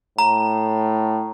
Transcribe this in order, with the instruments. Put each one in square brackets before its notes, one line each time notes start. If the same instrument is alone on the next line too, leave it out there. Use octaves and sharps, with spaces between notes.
[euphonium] A2 [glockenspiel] A#5